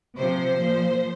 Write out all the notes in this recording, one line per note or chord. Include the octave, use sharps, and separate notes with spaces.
C3 F3 C5
A#2 F3